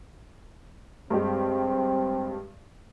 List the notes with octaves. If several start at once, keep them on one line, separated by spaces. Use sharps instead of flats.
G2 G#3 C4 G4